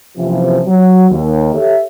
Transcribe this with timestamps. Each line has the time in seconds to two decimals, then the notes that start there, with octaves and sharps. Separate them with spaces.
0.17 F#1 C3 E3 F3
0.67 F#3
1.10 D#2
1.54 G4 A4 C#5 E5